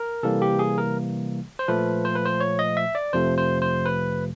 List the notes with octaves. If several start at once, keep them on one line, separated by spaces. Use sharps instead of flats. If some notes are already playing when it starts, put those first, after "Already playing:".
Already playing: A#4
C3 E3 G3 A#3 A4
G4
G#4
A#4
C5
A#2 F3 A3 B4
C5
B4
C5
C#5
D#5
E5
D5
F2 C3 F3 A3 C5
C5
C5
B4